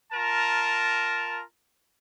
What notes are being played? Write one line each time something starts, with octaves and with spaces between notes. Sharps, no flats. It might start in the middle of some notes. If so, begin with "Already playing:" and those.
F4 A#4 A5 A#5